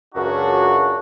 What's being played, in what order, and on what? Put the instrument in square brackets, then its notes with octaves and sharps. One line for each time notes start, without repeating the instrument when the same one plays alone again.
[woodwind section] C#2 F#2 [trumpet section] D4 F#4